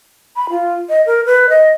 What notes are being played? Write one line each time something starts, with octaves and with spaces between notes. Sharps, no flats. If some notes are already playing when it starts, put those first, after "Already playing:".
B5
F4
D#5
A#4
B4
D#5